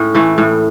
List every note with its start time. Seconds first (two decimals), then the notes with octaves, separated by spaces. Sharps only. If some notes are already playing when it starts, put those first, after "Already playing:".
Already playing: A2 C#4
0.15 E3 A3
0.38 A2